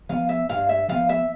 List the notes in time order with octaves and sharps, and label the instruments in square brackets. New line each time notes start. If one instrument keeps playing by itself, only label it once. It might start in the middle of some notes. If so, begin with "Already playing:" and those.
[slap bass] F3 B3 [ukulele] F5
[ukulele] E5
[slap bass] G2 [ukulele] F5
[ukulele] E5
[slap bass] F3 B3 [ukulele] F5
[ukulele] E5